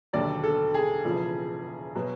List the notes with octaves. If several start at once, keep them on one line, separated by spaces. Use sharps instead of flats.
E1 D#2 D3 F#3 D5
A4
G#4
E1 E2 C#3 F3
B2 F#3